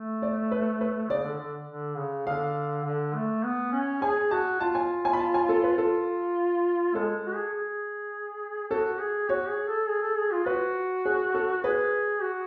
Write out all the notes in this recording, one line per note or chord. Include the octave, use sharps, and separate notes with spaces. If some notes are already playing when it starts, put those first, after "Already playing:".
Already playing: A3
D5
B4
B4
C#3 D5
D3
D3
D3
C#3
D3 F5
D3
A3
B3
C#4
G#4 G#5
F#4 A5
F4 A5
G#5
G#5
B5
A5
G#5
A4
B4
F4 A4
G#3 A4
F#4
G#4
G#4
F#4 A4
G#4
F#4 C#5
G#4
A4
G#4
A4
G#4
F4
F#4 B4
G#4
A4
G#4 B4
F#4